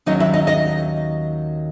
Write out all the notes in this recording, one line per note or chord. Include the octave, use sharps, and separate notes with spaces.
D#2 D#3 F#3 C#4 D#4 D#5
E4 E5
D#4 D#5
D#4 D#5